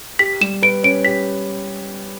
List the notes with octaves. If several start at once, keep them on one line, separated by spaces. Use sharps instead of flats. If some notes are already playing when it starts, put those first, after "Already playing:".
G4 B6
G3 E7
B4 D7
C#4 D7
G4 B6